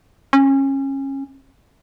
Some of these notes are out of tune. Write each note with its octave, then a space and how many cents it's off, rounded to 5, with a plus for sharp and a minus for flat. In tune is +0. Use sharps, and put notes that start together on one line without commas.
C#4 -25